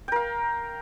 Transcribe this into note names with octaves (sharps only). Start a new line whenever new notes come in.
A#4 F5 G5